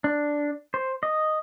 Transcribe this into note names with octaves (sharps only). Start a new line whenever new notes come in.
D4
C5
D#5